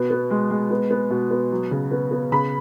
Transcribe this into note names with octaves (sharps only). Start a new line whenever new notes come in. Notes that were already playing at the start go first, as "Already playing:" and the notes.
Already playing: B2 B3
B3
G#3
G#3
B3
B3
B2
B3
F#3
C#3
B3
B3
C#3 B5